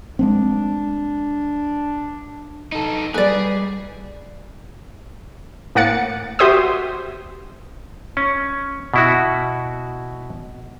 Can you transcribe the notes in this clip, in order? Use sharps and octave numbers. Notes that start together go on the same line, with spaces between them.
G#3 A#3 C4 D4
D#4 A4
G3 G#4 B4 D5
A2 A#3 F#5 A6 C#7
F#4 G4 C5 E5 D#6
C#4
B2 E4 F#4